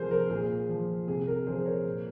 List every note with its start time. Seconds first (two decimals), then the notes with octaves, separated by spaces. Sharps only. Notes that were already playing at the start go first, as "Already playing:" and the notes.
Already playing: C3 F3 G#4 A#4 C5
0.11 A#4
0.30 A#2 G#4
0.69 F3
1.07 C3 G#4
1.27 A#4
1.46 F3 G#4 C5
1.65 A#4 C#5
1.85 A#2